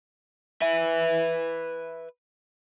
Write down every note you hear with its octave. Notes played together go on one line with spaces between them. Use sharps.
B4 E5